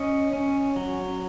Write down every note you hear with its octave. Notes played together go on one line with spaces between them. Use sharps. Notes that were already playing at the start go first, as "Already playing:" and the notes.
Already playing: C#4 D#5
C#4
F#3